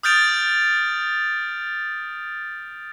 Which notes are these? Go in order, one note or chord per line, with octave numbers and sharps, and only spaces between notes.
D#6 F6 G6 A6 D7 F7